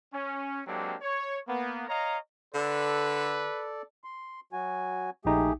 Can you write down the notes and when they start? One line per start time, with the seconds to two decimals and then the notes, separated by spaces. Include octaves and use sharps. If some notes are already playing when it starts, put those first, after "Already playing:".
0.14 C#4
0.66 F#3 G#3 A#3 C4 D4 G4
1.01 C#5
1.48 A#3 B3
1.89 C#5 D#5 F5 A#5
2.54 D3 A4 B4 D5
4.04 C6
4.53 F#3 F#4 G#5
5.25 A#1 A3 D#4 G4 G#4